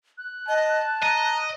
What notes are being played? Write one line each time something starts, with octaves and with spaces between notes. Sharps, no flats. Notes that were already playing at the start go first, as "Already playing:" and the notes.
F#6
D#5 A5
D#5 A#5